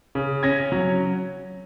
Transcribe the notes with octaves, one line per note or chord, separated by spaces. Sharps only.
C#3
C#4 G#6 A#6
F#3